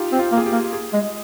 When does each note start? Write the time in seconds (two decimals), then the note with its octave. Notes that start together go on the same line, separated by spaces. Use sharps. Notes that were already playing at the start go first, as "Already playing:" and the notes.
Already playing: D#4 F4 G4
0.12 C4
0.19 F4
0.32 A#3
0.38 G#4
0.46 G4
0.52 A#3
0.73 G#4
0.93 G#3